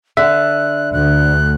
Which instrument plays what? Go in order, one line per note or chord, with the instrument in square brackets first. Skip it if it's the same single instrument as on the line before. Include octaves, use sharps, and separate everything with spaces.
[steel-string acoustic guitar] D3 [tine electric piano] E5 [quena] F#6
[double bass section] D2 [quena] F#6